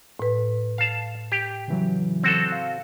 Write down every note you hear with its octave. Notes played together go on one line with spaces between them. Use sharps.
A2 B4
F5 A5
G4
C#3 E3 F#3
C4 F#4 A4
F5